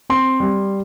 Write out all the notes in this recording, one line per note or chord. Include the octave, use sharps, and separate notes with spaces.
C4 C6
G3